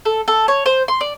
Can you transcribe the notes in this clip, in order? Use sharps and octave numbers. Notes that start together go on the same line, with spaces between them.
A4
A4
C#5
C5
C6
D5